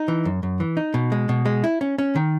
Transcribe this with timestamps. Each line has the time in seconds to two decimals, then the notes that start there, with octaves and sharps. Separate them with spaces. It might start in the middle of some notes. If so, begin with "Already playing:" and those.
Already playing: D#4
0.08 E3
0.25 F#2
0.43 F#2
0.60 E3
0.77 D#4
0.94 B2
1.12 G#3
1.29 B2
1.45 G#3
1.64 E4
1.81 C#4
1.98 C#4
2.16 D#3